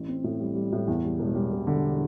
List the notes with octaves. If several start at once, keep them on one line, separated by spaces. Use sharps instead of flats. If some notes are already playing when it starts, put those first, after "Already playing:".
Already playing: A1
C4
A2
G3
G3
A2
E2
G3
E1
G3
E1
D3